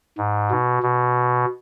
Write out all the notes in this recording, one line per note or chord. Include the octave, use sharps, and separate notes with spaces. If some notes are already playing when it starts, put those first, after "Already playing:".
G#2
B2
B2